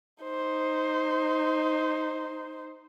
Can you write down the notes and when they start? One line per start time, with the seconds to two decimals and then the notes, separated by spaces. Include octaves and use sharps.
0.23 D#4 C5